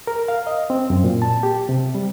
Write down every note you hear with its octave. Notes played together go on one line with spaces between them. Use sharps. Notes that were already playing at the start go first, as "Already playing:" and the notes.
A#4
F5
D#5
C4
F#2
A#2
A5
G4
C3
G3